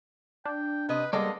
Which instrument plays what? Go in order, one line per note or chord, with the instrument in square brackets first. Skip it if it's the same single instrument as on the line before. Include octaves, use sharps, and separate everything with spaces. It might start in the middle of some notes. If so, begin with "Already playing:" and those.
[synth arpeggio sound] D4 [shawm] G5
[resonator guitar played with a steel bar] C3 D#5 [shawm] B4
[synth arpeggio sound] G3 [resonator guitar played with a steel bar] G#3 A#3 B3 [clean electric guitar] A4 D5 [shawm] D#5